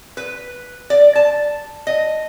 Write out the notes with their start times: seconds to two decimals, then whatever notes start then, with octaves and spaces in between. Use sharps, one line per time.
0.17 B4
0.90 D5
1.15 A5
1.87 D#5